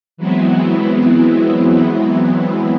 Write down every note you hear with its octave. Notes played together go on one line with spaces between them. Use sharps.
E3 F#3 G#3 B3 C4 E4